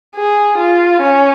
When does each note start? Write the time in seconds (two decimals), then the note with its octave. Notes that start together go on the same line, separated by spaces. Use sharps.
0.15 G#4
0.58 F4
1.01 C#4